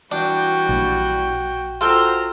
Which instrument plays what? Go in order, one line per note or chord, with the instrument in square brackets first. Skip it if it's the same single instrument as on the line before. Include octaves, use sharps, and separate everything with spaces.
[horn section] E3 G3 [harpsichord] D4 [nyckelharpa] F#4 G5
[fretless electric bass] A#1
[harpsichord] F4 A4 G5 [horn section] F#4 C5 A#5